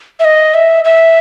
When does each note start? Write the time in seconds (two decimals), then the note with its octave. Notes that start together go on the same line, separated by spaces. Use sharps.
0.20 E5
0.25 D#5
0.54 E5
0.85 E5